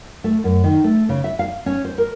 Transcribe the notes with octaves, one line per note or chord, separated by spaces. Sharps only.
A3
F#2
D#3
A3
C#3
E5
F5
C#4
C5
A#4